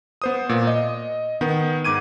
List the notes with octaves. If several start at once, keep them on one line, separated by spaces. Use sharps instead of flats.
B3 C5 D#6
A#2
D#5
D#3 B3
G#2 D6 G#6 D#7